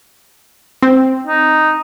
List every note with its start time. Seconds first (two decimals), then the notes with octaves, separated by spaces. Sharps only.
0.82 C4
1.27 D#4